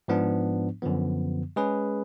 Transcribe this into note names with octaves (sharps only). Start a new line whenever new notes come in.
G#2 F3 B3 D4
F#2 D3 F3 B3
G#3 C#4 G#4 B4